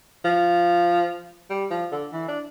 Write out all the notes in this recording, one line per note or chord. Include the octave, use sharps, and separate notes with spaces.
F3
G3
F3
D3
E3
D4